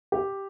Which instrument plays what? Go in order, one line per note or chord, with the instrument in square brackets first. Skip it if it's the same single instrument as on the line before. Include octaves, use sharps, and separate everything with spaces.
[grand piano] G4